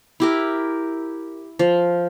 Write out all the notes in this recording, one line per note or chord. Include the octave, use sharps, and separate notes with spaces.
E4 G4 A#4
F3